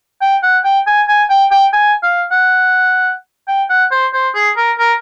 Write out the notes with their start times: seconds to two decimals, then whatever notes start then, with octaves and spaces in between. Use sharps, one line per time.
0.21 G5
0.43 F#5
0.64 G5
0.87 G#5
1.08 G#5
1.30 G5
1.51 G5
1.73 G#5
2.03 F5
2.31 F#5
3.48 G5
3.70 F#5
3.91 C5
4.14 C5
4.35 G#4
4.57 A#4
4.79 A#4